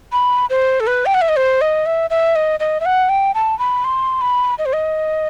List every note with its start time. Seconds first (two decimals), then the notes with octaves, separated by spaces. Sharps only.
0.12 B5
0.50 C5
0.80 A4
0.87 B4
1.06 G5
1.14 F#5
1.22 E5
1.29 D#5
1.36 C5
1.61 D#5
1.86 E5
2.10 E5
2.36 D#5
2.60 D#5
2.80 E5
2.85 F#5
3.09 G5
3.35 A5
3.59 B5
3.84 C6
4.21 B5
4.58 D#5
4.66 C5
4.73 D#5